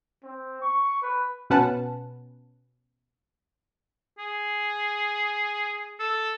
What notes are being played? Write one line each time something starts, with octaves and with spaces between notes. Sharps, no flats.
C4
C#6
B4
B2 C#4 B4 F#5 A5
G#4
A4